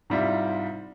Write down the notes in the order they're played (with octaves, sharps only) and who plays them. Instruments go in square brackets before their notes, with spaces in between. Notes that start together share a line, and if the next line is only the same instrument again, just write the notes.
[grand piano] G#2 C3 G3 E4 F4 E5